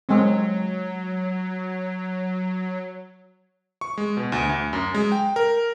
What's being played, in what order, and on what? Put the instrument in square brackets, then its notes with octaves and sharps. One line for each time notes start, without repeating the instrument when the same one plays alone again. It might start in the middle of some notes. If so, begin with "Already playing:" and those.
[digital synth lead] F#3 [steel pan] G#3 C4
[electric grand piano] C#6
G#3
B2
D2
D2
F#2
G#3
G5
A#4